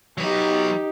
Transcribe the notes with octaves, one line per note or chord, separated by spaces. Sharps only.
F#3 D#4 G4 B4